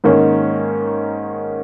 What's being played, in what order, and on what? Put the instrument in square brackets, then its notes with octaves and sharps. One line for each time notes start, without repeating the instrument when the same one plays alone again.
[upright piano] G#2 D#3 A#3 C#4